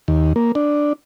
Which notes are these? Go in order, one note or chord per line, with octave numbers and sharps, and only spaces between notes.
D#2
A#3
D4